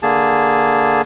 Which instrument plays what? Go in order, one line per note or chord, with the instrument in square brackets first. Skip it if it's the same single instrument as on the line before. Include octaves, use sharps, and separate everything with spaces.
[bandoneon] D3 A#3 G#4 A5